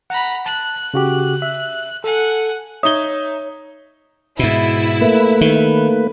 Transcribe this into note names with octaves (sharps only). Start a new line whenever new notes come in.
F#5 A#5 B5
A5 F#6
C#3 F#4 G4
E5
A4 F#5 G#5
D#4 C#5 E5 D#6 G#6 G7
G#2 B2 E4
A3 A#3 B4
D#3